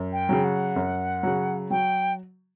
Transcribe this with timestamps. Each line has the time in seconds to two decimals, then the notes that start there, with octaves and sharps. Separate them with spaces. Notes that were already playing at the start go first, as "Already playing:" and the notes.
Already playing: F#2
0.13 G5
0.29 C#3 F#3
0.44 F#5
0.76 F#2
1.23 C#3 F#3
1.71 F#3 G5